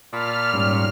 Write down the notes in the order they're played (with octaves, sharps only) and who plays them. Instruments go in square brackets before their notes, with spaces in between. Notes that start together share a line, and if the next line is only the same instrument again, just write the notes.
[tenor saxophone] A#2 [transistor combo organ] A5 B5 [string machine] F6
[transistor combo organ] G#2 G3 C#4